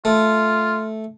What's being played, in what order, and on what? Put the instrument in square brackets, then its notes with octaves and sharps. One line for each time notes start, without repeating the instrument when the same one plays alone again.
[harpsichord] A3 [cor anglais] F4